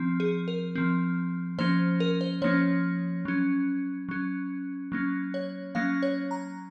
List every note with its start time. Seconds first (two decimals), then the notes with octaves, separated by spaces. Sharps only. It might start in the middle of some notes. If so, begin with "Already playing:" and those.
Already playing: F3 C4
0.20 G#4
0.48 A#4
0.75 F3 C4
1.59 F3 A#3 C#4 C5
2.00 A#4
2.21 C5
2.42 F3 A#3 C#4 C#5
3.25 F#3 C#4
4.09 F#3 C#4
4.92 F#3 A#3 C#4
5.34 C#5
5.75 F#3 A#3 C#4 F5
6.02 C#5
6.31 A#5